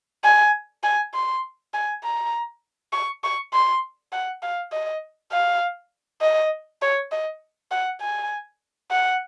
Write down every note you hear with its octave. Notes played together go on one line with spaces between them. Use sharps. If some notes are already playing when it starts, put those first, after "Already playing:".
G#5
G#5
C6
G#5
A#5
C#6
C#6
C6
F#5
F5
D#5
F5
D#5
C#5
D#5
F#5
G#5
F#5